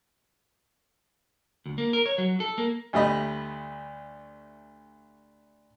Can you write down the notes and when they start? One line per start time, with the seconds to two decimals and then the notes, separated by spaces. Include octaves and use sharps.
1.66 D2
1.78 A#3
1.93 A#4
2.06 C#5
2.18 F#3
2.40 A4
2.58 A#3
2.93 D2 G3 A3 D#5 B5